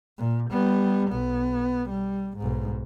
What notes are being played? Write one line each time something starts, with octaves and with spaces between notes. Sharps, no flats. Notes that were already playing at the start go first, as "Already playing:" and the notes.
A#2
G3 B3
B1 B3
G3
B1 G#2